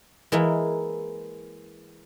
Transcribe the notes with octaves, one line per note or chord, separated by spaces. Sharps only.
E3 G#3 A#3 E4